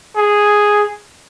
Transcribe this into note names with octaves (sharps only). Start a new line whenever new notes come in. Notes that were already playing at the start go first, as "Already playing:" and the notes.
G#4